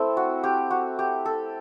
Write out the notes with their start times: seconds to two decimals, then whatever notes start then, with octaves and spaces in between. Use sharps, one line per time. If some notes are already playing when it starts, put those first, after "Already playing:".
Already playing: A3 C4 E4 A4
0.17 F#4
0.44 G4
0.71 F#4
0.99 G4
1.26 A4